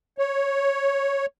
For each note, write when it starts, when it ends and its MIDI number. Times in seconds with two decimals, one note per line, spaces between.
0.18 1.26 73